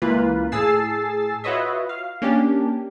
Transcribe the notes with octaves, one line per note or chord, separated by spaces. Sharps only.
C#2 E3 A#3 F4 B4
A2 G#4 A5 E6 A6 C7
F4 F#4 B4 C#5 D#5 E5
F5
A#3 C#4 D4 G4